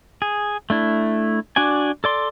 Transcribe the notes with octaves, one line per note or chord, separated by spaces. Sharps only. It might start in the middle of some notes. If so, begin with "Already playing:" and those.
G#4
A3 D4 E4
D4 F#4 D5 G#5
A4 D5 C6